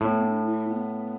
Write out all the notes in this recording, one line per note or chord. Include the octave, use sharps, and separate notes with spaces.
A2 B3
D4
E4
B3